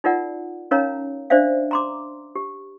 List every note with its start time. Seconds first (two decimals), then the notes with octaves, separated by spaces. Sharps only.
0.04 D#4 F4 A#4 D5 F#5
0.71 C#4 D#4 A#4 C#5 F5 A#5
1.30 D4 C5 D5 E5 F5
1.71 A#5 C6 D6
2.35 G4